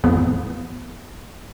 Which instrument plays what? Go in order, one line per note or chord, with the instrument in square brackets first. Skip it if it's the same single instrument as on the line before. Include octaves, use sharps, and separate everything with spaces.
[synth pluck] A1 F2 F3 B3